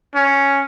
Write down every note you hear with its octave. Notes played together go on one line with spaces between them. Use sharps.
C#4